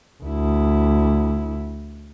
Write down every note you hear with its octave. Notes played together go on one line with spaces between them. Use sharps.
D2 E4